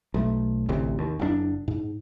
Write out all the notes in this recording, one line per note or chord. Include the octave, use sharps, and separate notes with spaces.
B1 A3
A1 D2 A2 C3
D#2
F#1 B2 D4
G#2